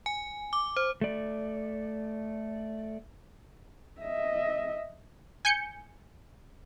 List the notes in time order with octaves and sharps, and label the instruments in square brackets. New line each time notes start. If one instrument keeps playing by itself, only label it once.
[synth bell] G#5
D6
C5
[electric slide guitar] A3 D5
[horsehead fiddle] D#5 E5
[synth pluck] G#5 G6 C#7